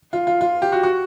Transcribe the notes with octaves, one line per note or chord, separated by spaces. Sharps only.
F4
F4
F4
G4
F#4
F#4